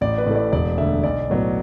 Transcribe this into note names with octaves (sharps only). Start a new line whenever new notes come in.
A1 D5
B4
A2 A3
D5
E1 D5
D2 D3 E5
B1 D5
A2 F#3 B3